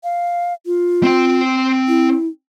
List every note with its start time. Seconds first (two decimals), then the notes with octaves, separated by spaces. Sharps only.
0.04 F5
0.66 F4
1.03 C4 G5
1.88 E4